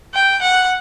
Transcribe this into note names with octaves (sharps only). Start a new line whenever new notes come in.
G5
F#5